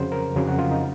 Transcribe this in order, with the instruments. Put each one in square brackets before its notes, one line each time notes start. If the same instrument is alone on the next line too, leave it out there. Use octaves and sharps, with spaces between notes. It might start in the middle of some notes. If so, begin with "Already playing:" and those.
Already playing: [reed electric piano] F2 C#3 F#3 C5
A#4
F2 C#3 F#3 G#4
F#4
F4
D#4